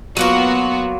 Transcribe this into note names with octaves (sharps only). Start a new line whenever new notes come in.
F#3 A#3 B3 F4 F#4